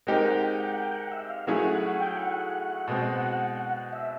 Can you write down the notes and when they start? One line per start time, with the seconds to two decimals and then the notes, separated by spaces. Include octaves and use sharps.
0.07 G#3 C4 D#4 G4 A#4 G5
0.24 F#5
0.43 G5
0.60 F#5
0.77 G5
0.95 F#5
1.12 E5
1.29 F5
1.47 F#3 A3 C#4 E4 G#4 F#5
1.64 F#5
1.82 F#5
2.00 G5
2.17 F#5
2.88 B2 G#3 C4
3.57 F#5
3.93 E5